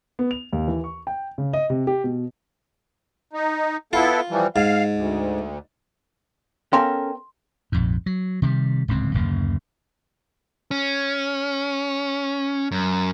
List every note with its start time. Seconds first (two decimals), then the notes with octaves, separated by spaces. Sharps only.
0.19 B3
0.31 F7
0.53 D#2
0.68 E3
0.84 C#6
1.07 G5
1.38 C#3
1.53 D#5
1.70 C3
1.87 G4
2.04 B2
3.33 D#4
3.93 B3 E4 F4 A4
4.30 E3 F3 G3
4.56 G#2 F5
4.94 D2
6.73 B3 C#4 A4 A#4 F5 G5 G#5 C6
7.72 A#1 F2 G#2
8.06 F#3
8.42 C3 D#3 F3 G3
8.88 D1 C#2 G#2 C4
9.14 D1 F#2 C#3 A#3
10.71 C#4
12.71 F#2